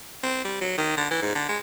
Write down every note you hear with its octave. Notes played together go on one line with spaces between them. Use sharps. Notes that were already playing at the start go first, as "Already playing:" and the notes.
C4
G3
F#3
D#3
D3
E3
G#2
D3
G#3